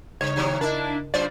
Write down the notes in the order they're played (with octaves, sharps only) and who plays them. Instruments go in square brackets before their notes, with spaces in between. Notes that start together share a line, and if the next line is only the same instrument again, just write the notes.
[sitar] G2 [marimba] C#3 [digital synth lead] C#5
[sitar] D#2 C3 F#3
[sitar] A#3 E4 [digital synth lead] D4 [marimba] A#4 D#5
[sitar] F#2 F4 C5 [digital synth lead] D5